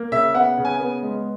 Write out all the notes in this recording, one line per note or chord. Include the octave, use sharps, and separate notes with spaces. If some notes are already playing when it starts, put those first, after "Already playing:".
Already playing: A#3
C#3 E5
B3 F#5
C#3
G#5
B3
G#3